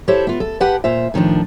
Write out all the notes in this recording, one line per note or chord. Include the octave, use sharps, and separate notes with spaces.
E4 G4 A4 C5 C#5
B3 F4
A4
G4 B4 F#5 G5 A5
A#2 F4 C5 E5
A2 D#3 F3 D4